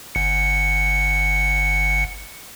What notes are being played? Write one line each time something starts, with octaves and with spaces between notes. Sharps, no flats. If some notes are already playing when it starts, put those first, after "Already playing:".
G1 C#7